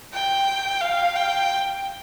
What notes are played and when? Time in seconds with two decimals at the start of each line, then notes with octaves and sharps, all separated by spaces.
0.14 G5
0.81 F5
1.16 G5